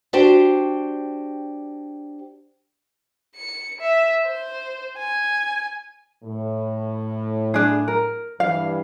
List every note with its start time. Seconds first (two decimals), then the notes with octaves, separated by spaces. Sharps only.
0.13 D4 F#4 G4 C5 G5
3.35 C#7
3.81 E5
4.26 C5
4.98 G#5
6.24 A2
7.54 D4 G#4
7.88 A#4
8.40 G2 E3 F5